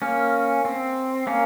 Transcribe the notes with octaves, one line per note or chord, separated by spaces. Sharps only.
A#3 C#4
C4
A#3 C#4